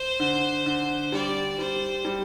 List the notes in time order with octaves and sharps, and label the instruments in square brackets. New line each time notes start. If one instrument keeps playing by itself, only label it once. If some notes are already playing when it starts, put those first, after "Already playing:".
Already playing: [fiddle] C5
[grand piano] D3
D3
[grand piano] G3 [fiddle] D5
[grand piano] G3 [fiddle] C5
[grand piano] G3